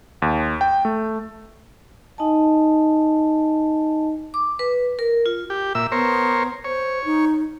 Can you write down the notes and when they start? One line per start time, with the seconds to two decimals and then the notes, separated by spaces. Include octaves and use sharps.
0.22 D#2
0.61 G5
0.85 A3
2.18 D#4 D#5 G#5 A5
4.34 D6
4.59 B4
4.99 A#4
5.26 F4
5.50 G4
5.75 A#2 E5 E6
5.92 B3 A#4 C5 C#5
6.64 C5 C#5
7.05 D#4